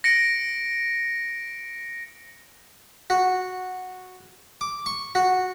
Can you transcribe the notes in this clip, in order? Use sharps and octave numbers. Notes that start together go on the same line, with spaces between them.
A#6 C#7 D7
F#4
D6
C#6
F#4